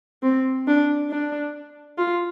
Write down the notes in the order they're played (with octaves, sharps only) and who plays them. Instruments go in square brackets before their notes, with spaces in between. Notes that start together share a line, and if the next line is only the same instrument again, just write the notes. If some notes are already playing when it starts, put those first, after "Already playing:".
[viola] C4
D4
D4
F4